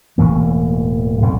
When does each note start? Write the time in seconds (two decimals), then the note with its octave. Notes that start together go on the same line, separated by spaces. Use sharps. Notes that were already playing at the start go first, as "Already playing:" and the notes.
0.18 E1 A2 E3 A#3
1.22 B1 F2 G3